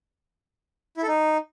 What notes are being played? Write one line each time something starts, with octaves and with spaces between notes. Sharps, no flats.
E4
A4
D#4